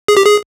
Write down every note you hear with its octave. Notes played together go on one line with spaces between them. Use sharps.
G#4
G4
G#4